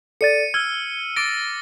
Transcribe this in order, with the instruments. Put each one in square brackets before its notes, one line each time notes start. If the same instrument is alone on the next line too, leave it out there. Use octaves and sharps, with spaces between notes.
[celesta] A4 D5 A6 [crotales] C#7 D#7
[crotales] E6 F6 [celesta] G#6
[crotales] D6 A6 A#6 [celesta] D7